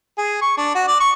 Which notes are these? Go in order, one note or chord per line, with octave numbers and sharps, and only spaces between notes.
G#4
C#6
D4
F#4
D5
C#6